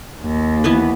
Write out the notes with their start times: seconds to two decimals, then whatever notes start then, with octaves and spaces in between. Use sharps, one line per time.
0.22 D#2
0.64 E3 B3 B4